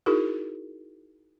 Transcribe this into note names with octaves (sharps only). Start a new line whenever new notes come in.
D#4 E4 F#4 G#4 A#4